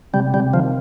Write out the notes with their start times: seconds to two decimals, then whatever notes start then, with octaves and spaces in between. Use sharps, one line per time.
0.13 C3 G3
0.34 C3 G3
0.54 D#3 F3